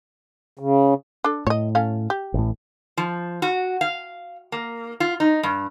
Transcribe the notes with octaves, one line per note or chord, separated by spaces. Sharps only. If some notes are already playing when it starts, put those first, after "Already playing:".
C#3
D4 A4
A2 C#5 D#5
C#4 A4 F5
G4
A1 A2
F3
F#4
F5
A#3
F4
D#4
G2